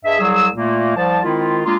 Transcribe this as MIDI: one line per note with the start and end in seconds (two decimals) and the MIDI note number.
0.05 0.19 43
0.05 0.19 68
0.05 0.19 75
0.05 0.19 76
0.19 0.47 36
0.19 0.47 54
0.19 0.47 55
0.19 0.47 68
0.19 0.47 88
0.55 0.96 46
0.55 0.96 57
0.55 0.96 58
0.96 1.19 36
0.96 1.19 53
0.96 1.19 81
1.23 1.60 51
1.23 1.60 56
1.23 1.60 60
1.23 1.60 64
1.23 1.60 65
1.65 1.76 56
1.65 1.76 58
1.65 1.76 62
1.65 1.76 65